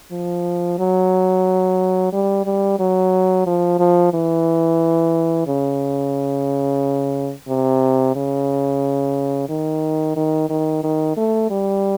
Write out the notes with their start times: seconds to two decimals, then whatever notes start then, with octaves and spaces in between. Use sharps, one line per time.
0.11 F3
0.79 F#3
2.12 G3
2.45 G3
2.79 F#3
3.46 F3
3.79 F3
4.13 E3
5.47 C#3
7.48 C3
8.16 C#3
9.49 D#3
10.16 D#3
10.50 D#3
10.83 D#3
11.17 A3
11.50 G3